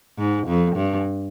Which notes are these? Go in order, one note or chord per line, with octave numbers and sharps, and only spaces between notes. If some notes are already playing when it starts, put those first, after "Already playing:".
G#2
F2
G2